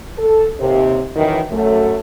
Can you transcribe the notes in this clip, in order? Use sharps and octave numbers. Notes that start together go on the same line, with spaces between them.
A4
D#2 C3
F#2 D#3 E3
F#2 A3